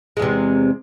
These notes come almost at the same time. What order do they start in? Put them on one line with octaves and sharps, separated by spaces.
G#3 E2 C3